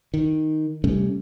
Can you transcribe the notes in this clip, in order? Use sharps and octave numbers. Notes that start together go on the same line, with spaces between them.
D#3
C3 G3 A3 C#4